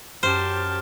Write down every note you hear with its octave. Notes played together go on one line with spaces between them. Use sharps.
F#2 G4 C5 A5 F6 E7